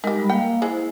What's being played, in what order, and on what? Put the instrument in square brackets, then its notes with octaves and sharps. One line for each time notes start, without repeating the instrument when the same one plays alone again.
[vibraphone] G#3 A#4 [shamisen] D#4 G4
[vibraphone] G3 B5
[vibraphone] A#3 F5 [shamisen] G5
[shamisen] G#3 [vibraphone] E4 C5